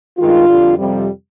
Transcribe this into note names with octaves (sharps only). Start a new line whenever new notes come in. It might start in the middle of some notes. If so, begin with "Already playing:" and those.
G2 D#3 G#3 F4
F2 D3 G3
F2 C3 G3